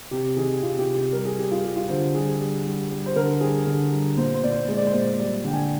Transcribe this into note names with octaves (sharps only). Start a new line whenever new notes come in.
C3 G4
D#3 G#4
C3 F4
G4
C3
G4
G3 A#4
G#4
G3 G4
F4
G3 G4
F4
D3 C5
G3 G#4
G3
G3
G3
C5
D3 A#4
G3 G#4
D3
G3
A#2 C5
C5
A#2 D5
C5
G#3 C5
D5
C5
A#2
G3 D5
D3 G5
G#5